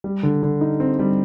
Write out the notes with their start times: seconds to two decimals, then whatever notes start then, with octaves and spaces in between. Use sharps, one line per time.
0.04 G3
0.23 D3
0.43 D3
0.61 D#4
0.80 C4
0.99 G3